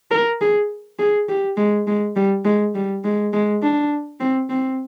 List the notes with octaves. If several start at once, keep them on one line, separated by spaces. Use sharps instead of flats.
A#4
G#4
G#4
G4
G#3
G#3
G3
G#3
G3
G#3
G#3
D4
C4
C4